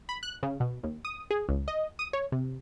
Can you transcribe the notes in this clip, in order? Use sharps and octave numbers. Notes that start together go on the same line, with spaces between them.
B5
F#6
C#3
B2
D#2
D#6
G#4
C#2
D#5
D#6
C#5
C3